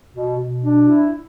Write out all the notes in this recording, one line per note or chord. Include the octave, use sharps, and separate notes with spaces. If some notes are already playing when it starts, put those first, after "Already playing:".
B2
B2
D4
E4